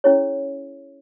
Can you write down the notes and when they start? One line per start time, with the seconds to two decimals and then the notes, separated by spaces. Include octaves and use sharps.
0.04 C#4 E4 G#4 C#5